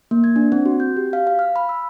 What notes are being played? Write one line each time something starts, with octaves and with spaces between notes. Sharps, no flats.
A#3
G#6
D4
C4
F#4
G6
G4
F5
F5
F6
B5
E6